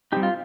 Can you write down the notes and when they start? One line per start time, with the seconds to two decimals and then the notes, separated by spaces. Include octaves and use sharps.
0.12 G3 C4 D#4 G4
0.23 F4